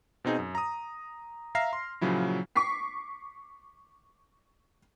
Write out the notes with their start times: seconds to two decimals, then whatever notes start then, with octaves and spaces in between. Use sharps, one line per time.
0.24 B2 C4 D#4 G#4
0.39 F#2
0.55 A#5 D#6
1.55 E5 F5 A#5 F6 A#6 C7
1.73 C6
2.01 A#2 C#3 F3 F#3 E4
2.56 C#6 D6 B6 C7